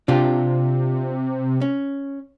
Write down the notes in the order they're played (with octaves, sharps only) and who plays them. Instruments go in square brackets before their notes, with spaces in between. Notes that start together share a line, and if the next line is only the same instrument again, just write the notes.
[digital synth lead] C3 [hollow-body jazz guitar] D4 F4 G4
[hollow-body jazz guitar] C#4